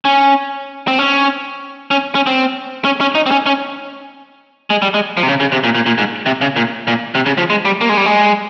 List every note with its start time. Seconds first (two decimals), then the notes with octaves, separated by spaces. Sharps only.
0.05 C#4
0.88 C4
0.99 C#4
1.91 C#4
2.15 C#4
2.27 C4
2.85 C#4
3.01 C#4
3.15 D#4
3.26 C4
3.31 C#4
3.46 C#4
4.70 G#3
4.82 G3
4.94 G#3
5.17 F3
5.23 C3
5.28 C#3
5.40 C#3
5.52 C3
5.64 A#2
5.75 A#2
5.86 A#2
5.98 G#2
6.26 C3
6.41 C#3
6.56 A#2
6.88 A#2
7.15 C3
7.26 C#3
7.38 F3
7.50 G#3
7.65 G3
7.81 A#3
7.89 G#3
7.97 G3
8.06 G#3